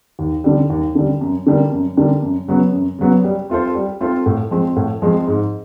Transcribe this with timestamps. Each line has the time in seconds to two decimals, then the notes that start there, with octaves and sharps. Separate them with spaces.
0.19 D#2
0.44 D3 G3
0.70 D#2
0.95 D3 G3
1.21 F#2
1.46 D3 G3 A#3
1.72 F#2
1.97 D3 G3 A#3
2.22 F#2
2.48 C#3 F#3 B3
2.73 F#2
2.99 C#3 F#3 B3
3.24 G3
3.50 C4 F4 A4 C5
3.75 G3
4.01 C4 F4 A4 C5
4.26 A2
4.51 F3 G#3 C4
4.76 A2
5.02 F3 G#3 C4
5.28 G#2